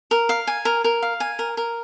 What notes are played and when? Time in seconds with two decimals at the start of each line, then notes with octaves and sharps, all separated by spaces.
0.11 A#4
0.29 F5
0.47 G#5
0.65 A#4
0.84 A#4
1.02 F5
1.20 G#5
1.39 A#4
1.57 A#4